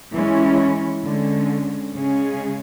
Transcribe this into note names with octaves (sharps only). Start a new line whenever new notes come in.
E3 G#3 C#4 E4
D3 G#3 C#4
C#3 G#3 C#4 G#4